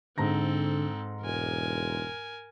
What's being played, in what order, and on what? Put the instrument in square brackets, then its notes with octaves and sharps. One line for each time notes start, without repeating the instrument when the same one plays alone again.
[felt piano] G#2 A#5 A#6 [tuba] D3 [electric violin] C4 A4
[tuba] E1 [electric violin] A#4 G#5